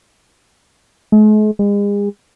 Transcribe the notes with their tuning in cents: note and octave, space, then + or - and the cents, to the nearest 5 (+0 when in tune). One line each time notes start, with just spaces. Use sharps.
G#3 +45
G#3 -40